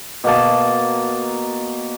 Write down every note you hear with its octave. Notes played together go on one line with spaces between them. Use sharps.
B2 A#3 A5